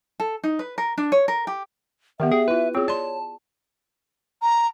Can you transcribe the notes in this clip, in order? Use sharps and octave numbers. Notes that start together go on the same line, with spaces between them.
A4
D#4
B4
A#4
D4
C#5
A#4
G4
D#3 B3 G4 D5 E5
G#4 G5
E4 F4 B4
C4 F4 G#4 C#5
D5 A5 C6
A#5